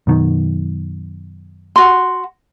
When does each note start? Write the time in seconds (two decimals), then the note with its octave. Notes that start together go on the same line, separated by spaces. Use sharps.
0.07 F#2 B2 D#3
1.76 F#4 C6